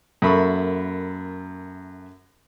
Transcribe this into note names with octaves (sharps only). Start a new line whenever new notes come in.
F#2 A#3 A4 E5 B5 C#6